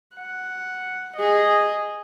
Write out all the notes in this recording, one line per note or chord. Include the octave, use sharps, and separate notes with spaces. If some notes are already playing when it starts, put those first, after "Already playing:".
F#5
G#4 D#5